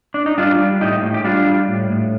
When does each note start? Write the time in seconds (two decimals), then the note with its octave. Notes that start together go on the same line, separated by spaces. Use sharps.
0.14 D4
0.26 D#4
0.38 G3 D4 F4
0.59 G3
0.81 A2 D#4 G4
1.03 A2
1.14 G4
1.24 G3 D4 F4
1.47 G3
1.68 A2
1.90 A2